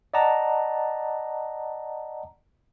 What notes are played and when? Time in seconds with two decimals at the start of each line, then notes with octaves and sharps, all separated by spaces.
0.14 D5 D#5 F#5 A5 A#5